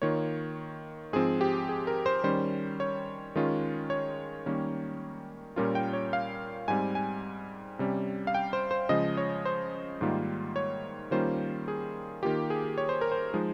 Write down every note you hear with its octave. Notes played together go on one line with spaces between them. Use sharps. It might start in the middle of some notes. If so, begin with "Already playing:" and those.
D#3 A#3 F4 C#5
G#2 F3 C4 G#4
G4
G#4
A#4
C5
D#3 G3 C#4 C5
C#5
D#3 G#3 C#4 F4
C#5
D#3 G3 A#3 C#4
A#2 G3 C#4 F4 A#4
G5
C#5
F5
G#2 G3 C4 G#5
G#5
C3 G3 C#4
F5
G5
C5
C5
C#3 F3 G#3 D#5
C#5
C5
G#2 D#3 G3 A#3 F4
C#5
D#3 G3 A#3 C#4 F4 C5
G#4
D#3 A#3 F4 G4
G#4
C#5
C5
A#4
C5
F3 G#3 D#4